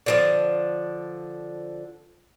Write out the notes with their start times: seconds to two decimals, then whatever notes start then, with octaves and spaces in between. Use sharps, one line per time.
0.06 D3 E3 F3